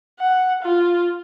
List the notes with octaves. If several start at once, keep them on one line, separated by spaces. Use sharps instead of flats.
F#5
F4